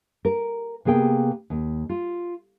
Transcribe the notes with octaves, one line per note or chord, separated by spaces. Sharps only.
A#4
C3 A#3 B3 G#4 A#4 G5
D#2
F4